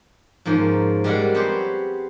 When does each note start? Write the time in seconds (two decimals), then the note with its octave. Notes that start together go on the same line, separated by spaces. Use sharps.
0.45 G#2 F3 A#3 C#4
1.04 G3 G#3 A#3 A#4 F5 F#5
1.34 B3 C4 G4 G#4 C5 C#5